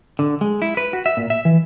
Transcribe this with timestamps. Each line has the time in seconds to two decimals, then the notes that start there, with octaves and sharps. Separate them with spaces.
0.19 D3
0.41 G#3
0.62 E4
0.77 B4
0.93 F#4
1.06 E5
1.17 A#2
1.30 E5
1.45 E3